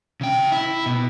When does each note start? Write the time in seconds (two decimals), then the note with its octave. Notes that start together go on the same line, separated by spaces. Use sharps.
0.21 C#3 G5
0.52 E4
0.86 B2